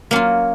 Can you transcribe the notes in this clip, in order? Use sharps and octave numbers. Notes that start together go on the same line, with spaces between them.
F#3 A#3 C#4 F4